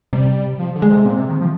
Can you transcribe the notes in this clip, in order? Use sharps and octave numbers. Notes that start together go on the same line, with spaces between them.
C3 G3
F3
D3
G#3
C3
A#2 C4
C3
D#3
F3